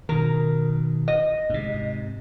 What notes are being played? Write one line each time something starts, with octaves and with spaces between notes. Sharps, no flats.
B2 D#3 A#4
D#5
G#2 C3